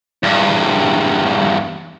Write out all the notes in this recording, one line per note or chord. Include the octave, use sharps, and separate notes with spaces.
E2 G2